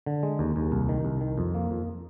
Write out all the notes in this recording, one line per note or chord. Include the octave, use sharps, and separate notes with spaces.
D3
G#3
D#2
D#2
C2
D#3
C2
D#3
F2
A#3
F2